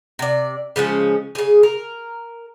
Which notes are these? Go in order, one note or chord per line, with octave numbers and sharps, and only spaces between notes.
C3 D5
C#3 F3 G#3 C#4
C#3 G#4
A#4